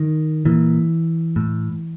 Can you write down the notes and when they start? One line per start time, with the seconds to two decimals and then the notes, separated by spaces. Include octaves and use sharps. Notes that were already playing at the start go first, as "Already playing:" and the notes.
Already playing: D#3
0.45 A#2 E3
1.36 A2